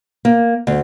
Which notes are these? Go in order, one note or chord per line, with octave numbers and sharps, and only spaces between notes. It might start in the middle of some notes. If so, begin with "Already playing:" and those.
A#3
D2